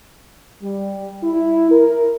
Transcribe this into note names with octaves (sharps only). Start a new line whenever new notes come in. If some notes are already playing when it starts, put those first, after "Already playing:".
G3
E4
A#4